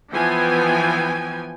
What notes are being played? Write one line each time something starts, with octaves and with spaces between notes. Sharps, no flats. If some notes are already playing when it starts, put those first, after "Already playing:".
E3 F3 B3 G5 G#5